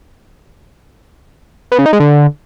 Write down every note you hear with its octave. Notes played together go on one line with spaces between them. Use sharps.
B3
C#3
D#4
G#3
D3